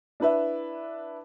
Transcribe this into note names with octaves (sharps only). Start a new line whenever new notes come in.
D4 E4 B4 E5